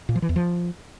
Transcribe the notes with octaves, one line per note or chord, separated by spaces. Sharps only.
A#2
F3
E3
E2
F3